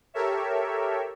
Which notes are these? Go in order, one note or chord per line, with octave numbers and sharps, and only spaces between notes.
G4 A4 A#4 C#5 E5